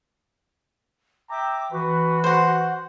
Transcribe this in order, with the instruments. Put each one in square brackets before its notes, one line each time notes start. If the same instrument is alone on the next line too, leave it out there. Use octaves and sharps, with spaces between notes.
[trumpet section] E5 G5 A#5 [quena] D6
[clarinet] E3 [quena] F#4 [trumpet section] B4
[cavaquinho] C5 F#5